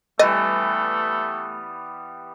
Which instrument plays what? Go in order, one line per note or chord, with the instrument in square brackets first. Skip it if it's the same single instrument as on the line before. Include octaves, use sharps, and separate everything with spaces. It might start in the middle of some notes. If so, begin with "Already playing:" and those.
[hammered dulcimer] E3 G3 B3 [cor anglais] A3 [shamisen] D#5